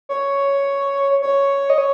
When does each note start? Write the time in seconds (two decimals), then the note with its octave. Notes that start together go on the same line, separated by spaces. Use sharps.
0.09 C#5
1.22 C#5
1.70 D#5
1.78 C#5